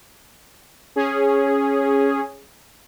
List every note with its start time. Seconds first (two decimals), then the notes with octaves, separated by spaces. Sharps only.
0.96 C#4 G#4